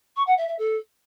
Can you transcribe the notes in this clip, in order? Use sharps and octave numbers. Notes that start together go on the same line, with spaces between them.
C#6
F#5
E5
E5
A4